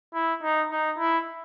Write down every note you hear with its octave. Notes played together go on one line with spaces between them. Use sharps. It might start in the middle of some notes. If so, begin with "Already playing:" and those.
E4
D#4
D#4
E4